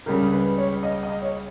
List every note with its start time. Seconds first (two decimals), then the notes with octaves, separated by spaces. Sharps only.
0.06 C#2 C#3 G3 A#4
0.32 B4
0.58 C#5
0.83 D#5
1.03 D#5
1.22 C#5